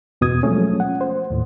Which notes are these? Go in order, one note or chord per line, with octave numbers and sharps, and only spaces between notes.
E2 B2 D#6 G#6
F3 F#3 G#3 A3 C#4
F#5
C5
D#2 A2